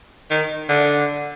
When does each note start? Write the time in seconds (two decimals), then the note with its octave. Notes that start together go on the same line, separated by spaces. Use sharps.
0.31 D#3
0.69 D3